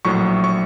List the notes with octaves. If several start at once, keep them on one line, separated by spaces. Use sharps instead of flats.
A#1 A2 F#3 C#6
C#6